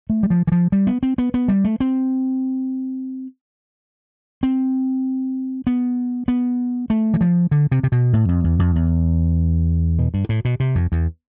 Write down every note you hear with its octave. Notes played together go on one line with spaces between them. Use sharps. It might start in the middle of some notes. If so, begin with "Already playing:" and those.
A3
G3
F3
E3
F3
G3
B3
C4
B3
B3
G3
A3
C4
C4
B3
B3
A3
E3
F3
D3
C3
C3
B2
A2
F2
E2
F2
E2
B2
G2
A2
B2
C3
F2
E2